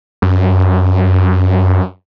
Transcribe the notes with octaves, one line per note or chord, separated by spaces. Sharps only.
F#2